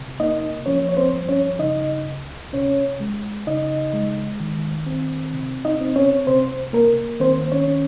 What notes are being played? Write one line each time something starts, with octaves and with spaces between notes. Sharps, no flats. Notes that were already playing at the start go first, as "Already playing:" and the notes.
Already playing: C3
A#3 D#4 D#5
F3 C#4 C#5
C#5
C4 C5
G2
C#4 C#5
C#3 D#4 D#5
C#2
C3 C#4 C#5
G#3
C#3 D#4 D#5
G#3
D#3
C4
C3
D#4 D#5
C4
C#4 C#5
C3 C4 C5
A#3 A#4
D#3 C4 C5
C#4 C#5
C#4